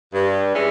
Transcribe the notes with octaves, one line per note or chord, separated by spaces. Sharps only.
G2
E3 G#3 C#4 E4